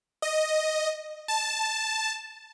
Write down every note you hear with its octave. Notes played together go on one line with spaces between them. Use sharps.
D#5
A5